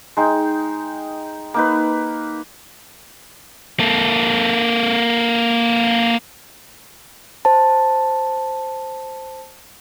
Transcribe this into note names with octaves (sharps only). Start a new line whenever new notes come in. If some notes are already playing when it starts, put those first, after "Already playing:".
G#3 D#4 G5
A#3 D#4 B4
A#3 A4
C5 A5